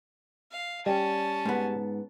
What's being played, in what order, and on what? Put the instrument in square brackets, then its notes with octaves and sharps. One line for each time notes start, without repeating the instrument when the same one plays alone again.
[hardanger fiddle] F5
[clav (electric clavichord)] G3 [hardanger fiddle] C#4 A5
[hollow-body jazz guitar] G#2 B3